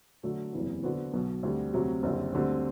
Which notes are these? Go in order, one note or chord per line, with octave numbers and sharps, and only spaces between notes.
D3 F#3 A3
F#1 E2 C3 E3
D3 F#3 B3 F#4 C5
B1 B2 F#3
D2 D3 G3 C4
D2 C3 F#3 C4 F#4
F#1 F#2 D3 G3 C4
D2 D3 G3 C4